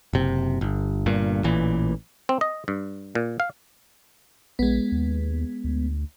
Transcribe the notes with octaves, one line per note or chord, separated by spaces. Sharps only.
F#1 C3
G1
G1 G2 A#2
A1 A#2 E3
C4
D#5
G2
A#2
F5
A#1 G#3 B3
D#2
D2